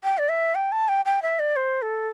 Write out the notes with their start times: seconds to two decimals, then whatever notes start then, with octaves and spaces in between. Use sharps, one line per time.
0.04 G5
0.18 D5
0.29 E5
0.55 G5
0.72 A5
0.88 G5
1.05 G5
1.22 E5
1.39 D5
1.56 C5
1.82 A4